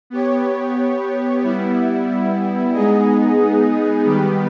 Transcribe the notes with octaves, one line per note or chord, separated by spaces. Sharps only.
B3 G4 C#5
G3 B3 E4
G#3 B3 D#4 G#4 D#5
D#3 G3 B3 G4 B4